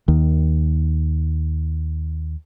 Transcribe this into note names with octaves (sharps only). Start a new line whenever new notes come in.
D#2 D#3